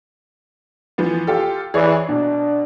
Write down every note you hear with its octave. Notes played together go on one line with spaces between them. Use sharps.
E3 F3 B3
F4 G4 A4
E3 G#4 C#5 D5
B2 D4